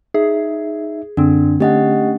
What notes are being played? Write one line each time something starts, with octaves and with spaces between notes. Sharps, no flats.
D#4 G#4 E5
F#2 D3 C4 D4
A3 C#4 D4 G4 D#5 F#5